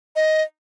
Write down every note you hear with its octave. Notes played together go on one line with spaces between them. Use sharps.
D#5